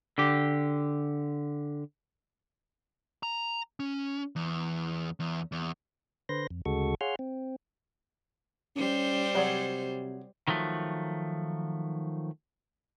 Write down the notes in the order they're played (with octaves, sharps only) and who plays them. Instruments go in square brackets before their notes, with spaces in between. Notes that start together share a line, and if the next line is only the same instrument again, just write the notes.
[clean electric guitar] D3 G4
[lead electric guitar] A#5
C#4
E2
E2
E2
[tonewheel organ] D3 B4 C5 C6 A#6
F2
D2 C#3 G#3 F#4 A4 C#6
G#4 C#5 F5 F#5 C6 F6
C4
[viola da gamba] G3 C5 [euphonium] C#4
[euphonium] C3 [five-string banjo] F#3 G#4 D5
[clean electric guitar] D#3 F3 F#3 A3